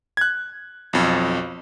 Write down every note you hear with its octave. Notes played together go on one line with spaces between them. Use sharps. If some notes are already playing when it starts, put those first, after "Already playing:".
F#6 G#6
B1 F2